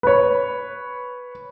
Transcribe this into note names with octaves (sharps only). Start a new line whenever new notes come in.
B4 C#5